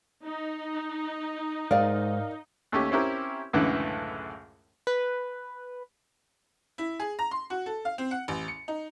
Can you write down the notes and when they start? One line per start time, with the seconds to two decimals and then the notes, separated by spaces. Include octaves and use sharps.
0.24 D#4
1.71 G#2 A#4 D5 D#5 F5
2.72 D#2 A3 C#4 G4
2.91 C4 C#4 E4 G4 A#4
3.53 C#2 F#2 A2 D3 E3 A3
4.87 B4
6.78 E4
7.00 G#4
7.19 A#5
7.31 C6
7.50 F#4
7.66 A4
7.85 F5
7.98 C4
8.11 F#5
8.28 A1
8.48 C#7
8.68 D#4